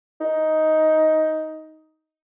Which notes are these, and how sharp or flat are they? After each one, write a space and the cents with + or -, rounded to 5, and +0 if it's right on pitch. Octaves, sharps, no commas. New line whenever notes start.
D#4 +10